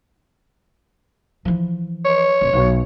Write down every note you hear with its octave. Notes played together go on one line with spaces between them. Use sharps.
E3 F3
C#5
E1
B1